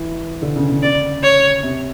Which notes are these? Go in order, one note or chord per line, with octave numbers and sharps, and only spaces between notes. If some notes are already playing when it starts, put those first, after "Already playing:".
Already playing: E3
D3
C#3
C#3
C#3 D5
C#5
C3